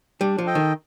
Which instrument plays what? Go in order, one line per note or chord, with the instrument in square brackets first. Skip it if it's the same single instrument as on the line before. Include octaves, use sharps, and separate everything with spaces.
[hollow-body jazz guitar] G3 [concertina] D4
[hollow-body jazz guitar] F3
[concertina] A4 D#5 G5
[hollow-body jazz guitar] D#3